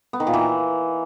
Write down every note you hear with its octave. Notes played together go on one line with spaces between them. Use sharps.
B3
D#3
A#2
E3